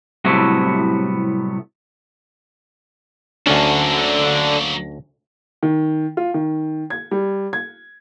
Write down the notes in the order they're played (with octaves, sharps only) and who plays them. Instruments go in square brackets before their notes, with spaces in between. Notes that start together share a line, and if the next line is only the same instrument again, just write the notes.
[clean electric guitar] C2 A2 C3 F#3 A3 B3
[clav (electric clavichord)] D2 C#4 [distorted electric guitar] F#3 A#3 [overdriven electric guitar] D4 A4
[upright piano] D#3
F4
D#3
G#6
G3
G#6